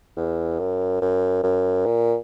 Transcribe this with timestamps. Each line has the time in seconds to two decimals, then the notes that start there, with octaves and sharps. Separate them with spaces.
0.17 E2
0.59 F#2
1.02 F#2
1.44 F#2
1.86 A#2